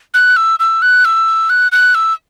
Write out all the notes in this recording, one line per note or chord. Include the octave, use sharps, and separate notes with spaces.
F#6
E6
E6
F#6
E6
F#6
F#6
E6